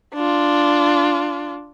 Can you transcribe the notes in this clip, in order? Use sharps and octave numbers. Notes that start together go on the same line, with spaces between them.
D4 F4